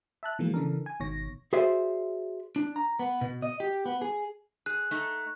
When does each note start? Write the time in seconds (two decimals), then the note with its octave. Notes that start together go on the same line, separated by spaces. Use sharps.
0.23 E5 A5 F#6
0.39 B2 E3 F3 G#3 A#3
0.54 C#3 E3 D4 A4 A#4
0.86 G#5
1.00 G#1 B2 D#3 C#5 A#6
1.53 F#4 G#4 C5 D5 E5
2.56 D4
2.76 A#5
2.99 B3
3.21 B2
3.42 D#5
3.60 G4
3.86 B3
4.02 G#4
4.66 G#4 F#6
4.91 A3 D#4